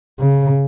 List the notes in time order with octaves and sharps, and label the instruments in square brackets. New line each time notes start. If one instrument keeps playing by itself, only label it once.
[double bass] C#3